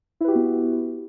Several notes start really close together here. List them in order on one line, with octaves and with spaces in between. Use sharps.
E4 B4 G4 F#4 B3